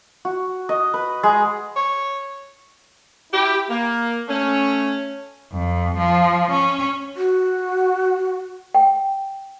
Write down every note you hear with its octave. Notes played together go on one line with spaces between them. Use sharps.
F#4
D#5
B4
G#3
C#5
E4 G4
A#3
A3 C#4
F2
F3
C#4
F#4
G5